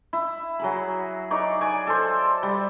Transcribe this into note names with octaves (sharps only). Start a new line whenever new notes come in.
E4
F#3 G#4 B5
D#4 C#5 D5
D5 G#5
A4 C5
G3